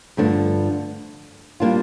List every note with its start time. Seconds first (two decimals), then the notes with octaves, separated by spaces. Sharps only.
0.17 G2 D3 F3 A3 D4
1.60 G3 A#3 D4 F4